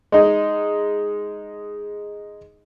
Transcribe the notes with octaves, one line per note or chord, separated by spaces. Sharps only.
G#3 D#4